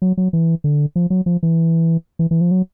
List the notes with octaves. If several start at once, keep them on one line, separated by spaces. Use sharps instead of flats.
F#3
F#3
E3
D3
F3
F#3
F3
E3
E3
E3
F3
F#3